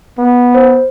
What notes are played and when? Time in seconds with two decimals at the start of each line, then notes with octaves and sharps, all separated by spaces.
0.19 B3
0.54 C5